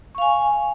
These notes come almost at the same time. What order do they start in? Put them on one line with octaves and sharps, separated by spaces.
C#6 F5 G#5